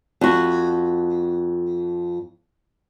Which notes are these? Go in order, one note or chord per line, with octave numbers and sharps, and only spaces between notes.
F2 F#4